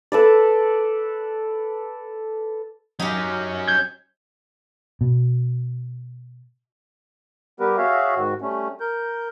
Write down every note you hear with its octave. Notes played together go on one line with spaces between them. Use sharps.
A4 B4 D5
F#3 C#4 D#4 G4
G6 G#6
B2
G3 B3 G4 A#4 B4
F#4 G#4 C#5 E5 F5
G#2 D#3 F#4
G3 A3 C#4
A#4 G6